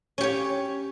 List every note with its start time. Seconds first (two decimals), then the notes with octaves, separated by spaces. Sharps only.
0.18 C#4
0.21 G4
0.23 C#5